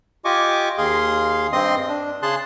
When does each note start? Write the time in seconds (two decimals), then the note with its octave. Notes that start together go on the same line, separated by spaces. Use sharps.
0.25 F4 G4 D#5 G#5 C#6 D6
0.78 D#2 G#4 F5 C6
1.53 G2 C4 D#5 C6 D#6
1.88 D4
2.22 C#3 G#4 A5 C6 F#6